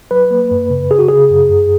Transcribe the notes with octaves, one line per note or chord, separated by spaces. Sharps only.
F#3 B4
A#3
F#2
C#3
C#3 G#4
F#4
C#3 G#4
F#2
F#2